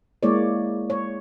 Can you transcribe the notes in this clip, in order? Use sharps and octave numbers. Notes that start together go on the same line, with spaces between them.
G#3 A#3 E4 C#5 D5
C#5